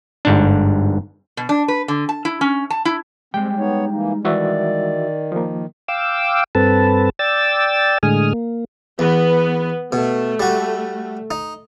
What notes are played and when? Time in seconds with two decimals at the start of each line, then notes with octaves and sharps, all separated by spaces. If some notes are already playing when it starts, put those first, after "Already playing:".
0.25 G1 G#2 D4
1.37 B2
1.49 D4
1.68 B4
1.88 D3
2.09 A5
2.25 E4
2.41 C#4
2.70 A5
2.85 E4
3.34 G3 G#3 C4 G5
3.58 B3 D#4 C#5
3.91 E3 A#3 D#4
4.25 D#3 E3 F#4 D5 E5
5.32 F3 A#3
5.88 F5 G5 D6 E6
6.55 G2 C4 A4 B4 A5
7.19 D5 G5 E6 A6
8.03 A2 D3 G#3 G#5 D#6 F6
8.33 A#3
8.99 E2 B3
9.92 B2 A3
10.40 G3 F#4
11.31 D#4